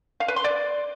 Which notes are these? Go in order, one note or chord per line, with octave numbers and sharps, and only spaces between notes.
F5
B4
C6
D5